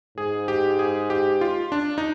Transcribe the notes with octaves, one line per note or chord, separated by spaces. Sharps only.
G#2 G#4
G4
G#4
G4
F4
D4
D#4